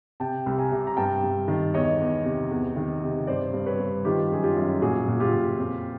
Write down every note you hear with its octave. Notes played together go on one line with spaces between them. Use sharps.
C3 G5 A5
C2
G#5 A#5
C3
A#5
G2 G5 A5
G2
D#3
E2 C#5 D#5
E2
C3
E2
D#3
C3
G2 C5 D5
G2
B4 C#5
G2
D#3 F4 G4
F#2 G#4
F4 G4
F#2
A#2 F#4 G#4
A#2
F4 G4
A#2
F2